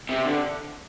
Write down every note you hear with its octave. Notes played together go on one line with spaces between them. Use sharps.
C3
D3